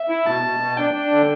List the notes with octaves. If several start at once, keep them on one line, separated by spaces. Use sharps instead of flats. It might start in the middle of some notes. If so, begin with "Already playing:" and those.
Already playing: E5
E4
B2 A5
B2
B2
D4 G5
D4
D3